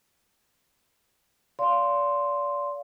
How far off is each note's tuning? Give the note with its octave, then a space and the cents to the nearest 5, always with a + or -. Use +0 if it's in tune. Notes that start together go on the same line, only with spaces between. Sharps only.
D5 -35 F5 +0 C6 +0